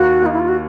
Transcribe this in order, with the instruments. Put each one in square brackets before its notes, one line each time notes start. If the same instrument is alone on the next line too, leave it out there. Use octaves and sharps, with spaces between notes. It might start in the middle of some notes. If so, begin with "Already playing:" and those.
Already playing: [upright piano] D#2 D#3 A#3 [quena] F#4
[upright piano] A#3 [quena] D#4
[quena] E4
F4
F#4